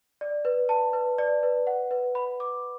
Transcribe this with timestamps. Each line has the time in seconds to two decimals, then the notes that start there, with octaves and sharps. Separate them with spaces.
0.21 D5
0.45 B4
0.69 A5
0.93 B4
1.18 D5
1.43 B4
1.67 F#5
1.91 B4
2.15 B5
2.40 D6